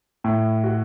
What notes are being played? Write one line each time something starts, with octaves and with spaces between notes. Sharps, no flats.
A2
F#4